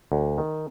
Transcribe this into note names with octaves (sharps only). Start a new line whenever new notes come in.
D2
D#3